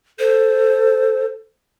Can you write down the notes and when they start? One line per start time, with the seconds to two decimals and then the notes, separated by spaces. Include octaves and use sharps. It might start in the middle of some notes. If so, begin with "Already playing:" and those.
0.19 A4 C5